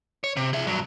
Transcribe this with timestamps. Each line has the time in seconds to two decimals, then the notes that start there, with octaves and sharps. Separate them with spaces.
0.24 C#5
0.37 C3
0.53 G#4 E5
0.67 G2 F#3